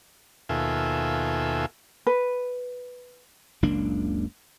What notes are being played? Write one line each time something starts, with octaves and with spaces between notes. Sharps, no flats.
D#2 B2 F4 A4 E5 G#5
B4
F#1 C#2 A#3 D4